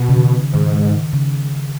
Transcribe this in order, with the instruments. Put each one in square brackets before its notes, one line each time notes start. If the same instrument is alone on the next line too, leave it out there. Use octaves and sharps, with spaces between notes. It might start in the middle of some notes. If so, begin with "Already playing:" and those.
Already playing: [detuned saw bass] B2
[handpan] C#3
D#3
C#3
[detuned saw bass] G#2 [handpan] D#3
[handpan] C#3